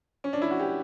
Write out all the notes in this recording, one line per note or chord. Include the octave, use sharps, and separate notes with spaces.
C#4
D4
E4
F#4
G4